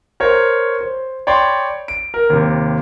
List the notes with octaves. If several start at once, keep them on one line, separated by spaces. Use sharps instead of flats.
A#4 C5 C#5
C5
C#5 D5 G5 B5 C6
D7
A#4
D#2 C3